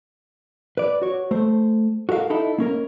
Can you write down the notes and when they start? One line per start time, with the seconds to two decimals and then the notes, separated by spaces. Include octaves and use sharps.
0.77 B4 D5
1.02 F#4 C#5
1.31 A3 C5
2.09 F#4 A4 A#4 E5 F5
2.30 D#4 E4 A4
2.58 A#3 C#4 A#4